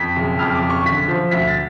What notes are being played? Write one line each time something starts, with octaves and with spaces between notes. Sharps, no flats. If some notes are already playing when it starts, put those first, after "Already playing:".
Already playing: F2 B6
F#1
F2 F6
D6
F#1
C#6
D3 B6
F3
D2 B6
A6